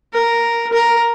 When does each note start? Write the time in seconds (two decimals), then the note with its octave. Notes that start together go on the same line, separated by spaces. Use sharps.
0.13 A#4
0.72 A#4